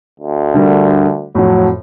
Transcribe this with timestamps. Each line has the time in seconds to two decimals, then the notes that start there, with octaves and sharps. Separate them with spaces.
0.20 D2
0.54 D3 G3 A#4
1.35 F2 A2 F#3